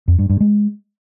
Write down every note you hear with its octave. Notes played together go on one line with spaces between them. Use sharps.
F2
G2
G2
G#3